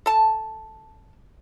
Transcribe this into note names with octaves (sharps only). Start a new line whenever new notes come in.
A4 A5